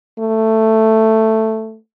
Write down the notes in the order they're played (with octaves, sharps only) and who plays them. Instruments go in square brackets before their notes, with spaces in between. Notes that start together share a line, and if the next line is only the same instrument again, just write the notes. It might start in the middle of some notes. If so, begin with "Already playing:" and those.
[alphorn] A3